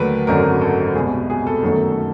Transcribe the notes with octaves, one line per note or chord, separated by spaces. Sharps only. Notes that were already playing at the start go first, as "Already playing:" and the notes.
Already playing: D#2 D3 F#3 A3 A#4 B4
G#1 F#2 D3 F#3 A#4
A4
C2 B2 G#3 G#4
G#4
A4
G1 F#2 D#3 F#3 A3